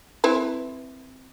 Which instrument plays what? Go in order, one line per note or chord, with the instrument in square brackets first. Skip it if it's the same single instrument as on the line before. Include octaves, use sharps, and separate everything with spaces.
[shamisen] C4 E4 B4